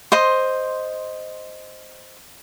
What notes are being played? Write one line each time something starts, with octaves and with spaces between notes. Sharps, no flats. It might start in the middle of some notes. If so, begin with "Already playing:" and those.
C5 D#5 C6